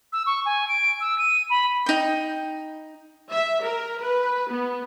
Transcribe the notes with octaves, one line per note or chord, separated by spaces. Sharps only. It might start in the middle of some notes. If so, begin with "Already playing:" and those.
E6
C#6
G#5
D7
E6
D#7
B5
D#4 G5
E5
A#4
B4
B3